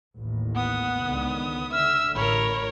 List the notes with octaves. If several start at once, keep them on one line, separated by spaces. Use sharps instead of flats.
A1 D#2 A2
B3 F#5 D#6
C#2 D3 D#3
D3 E5 E6 F6
A1 A#4 C#5 B5